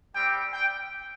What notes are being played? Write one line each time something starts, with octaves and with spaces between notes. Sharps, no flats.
G3 C4 G4 G5
G5